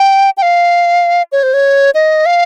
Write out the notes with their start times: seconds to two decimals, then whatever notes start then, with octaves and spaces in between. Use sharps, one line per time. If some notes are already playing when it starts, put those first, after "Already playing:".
Already playing: G5
0.37 G5
0.42 F5
1.32 C#5
1.43 C5
1.54 C#5
1.94 D#5
2.26 F5